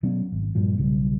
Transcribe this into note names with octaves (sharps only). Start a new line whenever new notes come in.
B2 F#3 B3 C#4
G#1
G2 A#2 F3
B1 C#3 G3